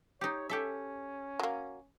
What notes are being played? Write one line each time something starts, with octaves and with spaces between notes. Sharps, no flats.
D#4 G4 C#5
C#4 G4 A4 E5
F#3 A#3